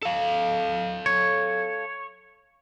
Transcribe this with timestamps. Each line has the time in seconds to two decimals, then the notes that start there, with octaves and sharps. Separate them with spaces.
0.02 A4 F5
1.06 C#5